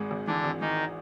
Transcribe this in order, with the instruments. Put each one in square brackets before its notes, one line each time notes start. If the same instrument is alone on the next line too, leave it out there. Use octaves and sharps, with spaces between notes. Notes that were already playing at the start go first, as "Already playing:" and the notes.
Already playing: [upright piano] G#1 G#2 G#3
G#1
[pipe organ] D3 D4 [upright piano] E3
[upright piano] G#1
[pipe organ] D#3 D#4 [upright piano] E3